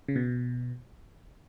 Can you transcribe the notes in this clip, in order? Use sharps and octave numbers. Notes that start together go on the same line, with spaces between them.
C#3
B2